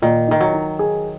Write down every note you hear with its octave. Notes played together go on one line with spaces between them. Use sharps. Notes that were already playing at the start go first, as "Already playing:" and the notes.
A#2 D#3
D#3 D#4
F#3
D#4
G#4